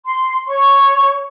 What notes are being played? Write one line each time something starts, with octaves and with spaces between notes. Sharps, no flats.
C6
C#5 C#6